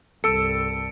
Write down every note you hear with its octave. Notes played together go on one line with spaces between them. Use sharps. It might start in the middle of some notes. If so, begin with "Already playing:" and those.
C2 G2 A4 E6 C#7 D7